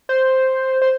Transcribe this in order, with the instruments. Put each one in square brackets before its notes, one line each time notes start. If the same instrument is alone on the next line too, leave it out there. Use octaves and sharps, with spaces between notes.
[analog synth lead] C5
C5